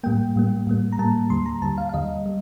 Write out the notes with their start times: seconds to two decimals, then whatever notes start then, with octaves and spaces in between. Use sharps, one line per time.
0.04 A2 G3 A#3 G5
0.36 A2 G3 A#3
0.67 A2 G3 A#3
0.92 A#5
0.98 A2 G3 A#3 A5
1.30 D#2 D3 G3 C6
1.46 A#5
1.62 D#2 D3 G3 A5
1.78 F5
1.89 F5
1.93 D#2 D3 G3 D#5
2.26 G3